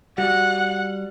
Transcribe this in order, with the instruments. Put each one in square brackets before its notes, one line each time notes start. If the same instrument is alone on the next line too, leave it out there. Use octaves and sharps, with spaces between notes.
[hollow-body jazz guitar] G3 F#4 [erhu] F#5